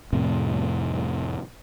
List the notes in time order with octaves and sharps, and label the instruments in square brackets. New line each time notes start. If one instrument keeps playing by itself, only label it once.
[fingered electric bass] F2 A2 C3